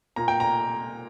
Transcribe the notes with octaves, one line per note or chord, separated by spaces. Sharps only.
A#2 A#5
G5
A#5